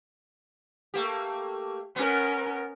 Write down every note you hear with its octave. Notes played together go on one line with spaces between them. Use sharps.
A3 A#3 G4
B3 C#4 A#4